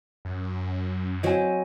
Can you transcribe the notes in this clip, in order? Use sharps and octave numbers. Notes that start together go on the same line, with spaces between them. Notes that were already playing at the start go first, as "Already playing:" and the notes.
F#2
F#3 C4 D#5 G#5